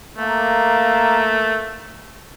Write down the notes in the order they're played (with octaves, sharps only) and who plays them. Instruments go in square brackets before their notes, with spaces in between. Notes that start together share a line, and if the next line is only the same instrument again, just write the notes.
[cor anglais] A3 [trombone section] A#3